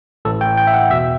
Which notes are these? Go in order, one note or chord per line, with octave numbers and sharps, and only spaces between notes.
A1 A2 E3 A4
G5
G5
E5
F#5
E2 B2 E5